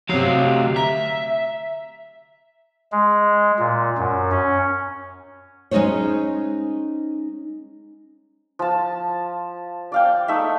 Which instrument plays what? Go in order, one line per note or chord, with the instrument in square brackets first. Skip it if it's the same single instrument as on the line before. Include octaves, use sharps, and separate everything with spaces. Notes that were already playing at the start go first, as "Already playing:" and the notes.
[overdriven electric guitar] D2 F5 [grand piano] C3 F#3
[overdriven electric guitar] E5 [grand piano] A#5
[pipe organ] G#3
A#2
F#2
C#4
[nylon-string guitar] G#3 C#4 D#4 G#4 C5 C#5
[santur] F3 A5
D5 F5 G5
A3 D#4 E5